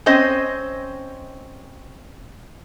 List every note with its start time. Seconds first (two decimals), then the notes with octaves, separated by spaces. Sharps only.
0.06 C4 C#4 C5 D#5